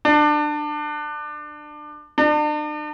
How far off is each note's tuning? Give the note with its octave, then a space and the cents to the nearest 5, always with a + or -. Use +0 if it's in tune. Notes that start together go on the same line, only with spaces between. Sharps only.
D4 +25
D4 +40